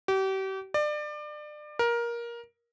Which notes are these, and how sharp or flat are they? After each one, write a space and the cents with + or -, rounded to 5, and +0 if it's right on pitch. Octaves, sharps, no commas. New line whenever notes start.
G4 -35
D5 +30
A#4 +15